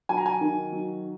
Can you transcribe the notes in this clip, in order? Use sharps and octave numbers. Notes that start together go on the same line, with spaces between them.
F#3 G#5
A#5
G#5
D#3
F#3